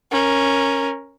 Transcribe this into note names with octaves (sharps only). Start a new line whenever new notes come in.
C#4 A#4